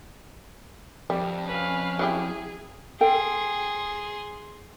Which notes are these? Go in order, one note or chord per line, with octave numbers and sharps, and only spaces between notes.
F2 G3
C#4 B4 F5
F#3 E4 G4 G#4
G#4 A4 G5 C6